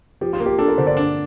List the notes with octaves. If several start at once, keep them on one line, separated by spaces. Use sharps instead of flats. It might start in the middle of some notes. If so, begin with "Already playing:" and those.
F3 G4
F4
A#3
G4
D4 A4
A#4
D3 C5
D5
D4